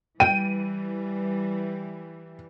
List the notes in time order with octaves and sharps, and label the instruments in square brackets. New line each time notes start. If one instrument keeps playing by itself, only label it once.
[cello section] E3 G3 [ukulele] G5 [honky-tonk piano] D#7